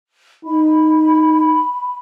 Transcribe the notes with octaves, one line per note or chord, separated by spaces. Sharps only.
D#4 B5